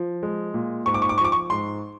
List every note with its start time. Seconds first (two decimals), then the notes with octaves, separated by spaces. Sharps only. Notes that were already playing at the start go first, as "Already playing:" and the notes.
Already playing: F3
0.23 G#3
0.54 A#2
0.86 G#2 C#6
0.94 D6
1.02 C#6
1.09 D6
1.18 F3 C#6
1.24 D6
1.32 C#6
1.50 G#2 C6